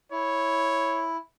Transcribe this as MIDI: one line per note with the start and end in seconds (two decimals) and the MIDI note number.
0.12 1.17 64
0.12 1.12 73